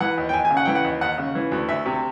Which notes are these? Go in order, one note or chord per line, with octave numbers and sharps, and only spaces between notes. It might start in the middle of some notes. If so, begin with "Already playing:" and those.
E3 F#5
D#2
G5
D#2 G#5
G#5
C#3
F#5
E3 G5
F#5
D#2
D#2 F#5
C#3
E3
D2
D2 E5
C3